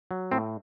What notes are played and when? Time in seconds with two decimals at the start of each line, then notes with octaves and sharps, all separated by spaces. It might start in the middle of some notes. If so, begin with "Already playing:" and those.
0.11 F#3
0.32 A2 C4